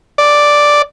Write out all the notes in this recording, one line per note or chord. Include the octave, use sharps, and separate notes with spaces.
D5